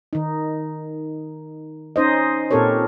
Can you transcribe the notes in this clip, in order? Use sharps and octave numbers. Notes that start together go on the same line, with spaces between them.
D#3 D#4
C#4 D#4 C5 D#5
A#2 C4 G4 A4 A#4 C#5